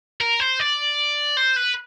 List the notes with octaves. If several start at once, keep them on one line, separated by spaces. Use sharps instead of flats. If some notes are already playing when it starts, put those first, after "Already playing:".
A#4
C5
D5
C5
B4